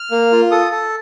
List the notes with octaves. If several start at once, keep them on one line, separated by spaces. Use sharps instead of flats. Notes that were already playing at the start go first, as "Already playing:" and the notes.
Already playing: F6
A#3
F4
A4 D#6
A4